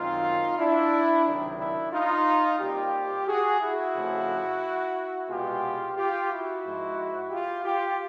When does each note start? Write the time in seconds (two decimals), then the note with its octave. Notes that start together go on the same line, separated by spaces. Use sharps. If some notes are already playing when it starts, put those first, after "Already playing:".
Already playing: F#2 D#3 G#3 C4 D#4 F4
0.58 D4 E4
1.25 C#2 C3 D#3 F#3
1.59 D4 E4
1.93 D#4 F4
2.60 A#2 G3 C4 F4 G4
3.27 F#4 G#4
3.61 E4 F#4
3.95 F2 C#3 F3 A3
5.29 C2 B2 G#3 B3 F4 G4
5.96 F4 G4
6.31 E4 F#4
6.64 G#2 F3 G#3
7.31 F4 G4
7.65 F4 G4